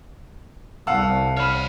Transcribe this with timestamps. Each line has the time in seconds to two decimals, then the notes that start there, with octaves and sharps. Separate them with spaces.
0.87 C2 F5 F#5 A5 E6
1.37 C#5 B5 F6